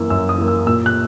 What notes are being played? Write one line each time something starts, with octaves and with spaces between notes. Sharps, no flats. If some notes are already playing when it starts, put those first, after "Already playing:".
Already playing: F#2 E3 A#3 E6
F#2 E6
D#6
E3 A#3
E6
A#2 E6
F#6